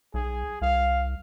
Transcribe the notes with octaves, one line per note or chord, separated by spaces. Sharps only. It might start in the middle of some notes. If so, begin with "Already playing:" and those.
B1 G#4
C2 F5